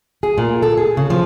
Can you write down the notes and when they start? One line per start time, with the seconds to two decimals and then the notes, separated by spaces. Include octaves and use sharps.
0.23 G#4
0.38 A#2
0.62 A4
0.77 G#4
0.97 C#3
1.10 F3